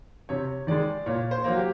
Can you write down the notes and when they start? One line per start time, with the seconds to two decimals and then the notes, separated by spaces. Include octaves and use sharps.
0.29 C3 C#5
0.67 D#3 G#3 D5
1.06 A#2 C#5
1.31 C5
1.44 F#3 A#3
1.57 G4